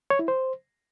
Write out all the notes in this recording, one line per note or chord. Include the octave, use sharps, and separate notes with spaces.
C#5
E4
C5